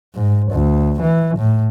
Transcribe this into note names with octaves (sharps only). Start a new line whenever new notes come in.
G#2
D2
E3
A2